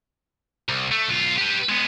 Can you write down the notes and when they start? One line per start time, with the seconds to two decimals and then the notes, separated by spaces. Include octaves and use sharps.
0.69 C2
0.91 A3
1.09 B1 F4
1.38 G4 B4
1.69 G#3 B3